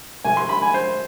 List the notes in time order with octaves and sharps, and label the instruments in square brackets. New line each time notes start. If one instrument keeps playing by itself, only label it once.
[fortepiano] C2 C3 G3 G#5
C6
B5
G#5
C5